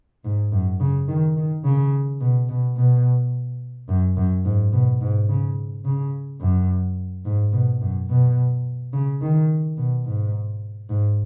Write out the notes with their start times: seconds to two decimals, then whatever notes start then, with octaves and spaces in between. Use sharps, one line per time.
0.25 G#2
0.53 F#2
0.80 C#3
1.08 D#3
1.37 D#3
1.64 C#3
2.21 B2
2.49 B2
2.77 B2
3.89 F#2
4.17 F#2
4.45 G#2
4.73 B2
5.01 G#2
5.29 C#3
5.85 C#3
6.41 F#2
7.25 G#2
7.53 B2
7.81 F#2
8.09 B2
8.93 C#3
9.21 D#3
9.77 B2
10.06 G#2
10.89 G#2